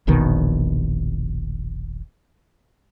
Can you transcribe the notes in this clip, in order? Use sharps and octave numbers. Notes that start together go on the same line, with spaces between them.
E1 A#1 B2 D#3